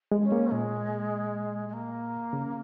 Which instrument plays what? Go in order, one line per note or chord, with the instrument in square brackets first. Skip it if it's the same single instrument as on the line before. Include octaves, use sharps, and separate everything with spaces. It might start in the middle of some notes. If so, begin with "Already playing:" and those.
[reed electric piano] G#3
[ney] C#4
[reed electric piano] A#3
[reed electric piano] A#2 [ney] G#3
[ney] G#3
A#3
[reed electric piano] C#3